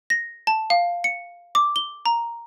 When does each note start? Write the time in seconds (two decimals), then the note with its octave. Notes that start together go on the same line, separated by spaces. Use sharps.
0.10 A#6
0.47 A5
0.70 F5
1.04 C#7
1.55 D6
1.76 G7
2.06 A#5